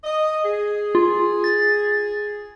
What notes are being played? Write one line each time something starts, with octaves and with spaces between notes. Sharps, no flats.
D#5
G#4
F4
A6